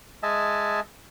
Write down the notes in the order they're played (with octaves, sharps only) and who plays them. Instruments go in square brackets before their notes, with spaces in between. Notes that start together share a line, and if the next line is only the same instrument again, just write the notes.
[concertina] G#3 D#5 E5 G#5 A5